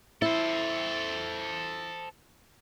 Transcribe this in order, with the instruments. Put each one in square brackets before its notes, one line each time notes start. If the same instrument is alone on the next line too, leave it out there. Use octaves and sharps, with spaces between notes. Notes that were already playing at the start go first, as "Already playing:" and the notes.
[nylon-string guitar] E4 [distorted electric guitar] A4 C5